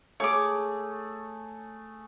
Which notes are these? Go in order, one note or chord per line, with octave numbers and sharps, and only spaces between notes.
A3 G#4 C#5 D6